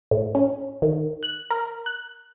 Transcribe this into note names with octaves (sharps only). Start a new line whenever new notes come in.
A2
C#4
D#3
F#6
A#4
F#6